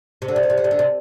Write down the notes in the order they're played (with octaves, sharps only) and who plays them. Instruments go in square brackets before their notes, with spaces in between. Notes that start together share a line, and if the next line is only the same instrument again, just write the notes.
[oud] C3
D3
C3
D3
C3
D3
C3
D3
C3